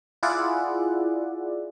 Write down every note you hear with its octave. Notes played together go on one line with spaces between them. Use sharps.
E4 F4 G#4 D5 E5 F#5